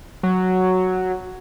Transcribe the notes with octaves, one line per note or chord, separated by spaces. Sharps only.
F#3